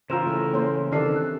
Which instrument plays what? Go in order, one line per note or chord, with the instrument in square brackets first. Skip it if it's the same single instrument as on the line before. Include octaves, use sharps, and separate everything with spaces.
[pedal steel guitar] C#3 E3 A#4 [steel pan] F4 C5 [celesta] A#5 E6 E7
[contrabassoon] A2 [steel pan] A3
[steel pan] A#3 C5 [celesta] C#5 C6
[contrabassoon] C3 [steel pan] D#3 D4 A4 [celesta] F6 C7
[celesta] F#6